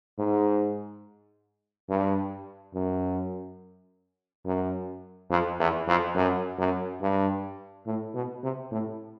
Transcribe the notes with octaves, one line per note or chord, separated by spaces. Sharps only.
G#2
G2
F#2
F#2
F2
E2
F2
F#2
F#2
G2
A2
B2
C3
A2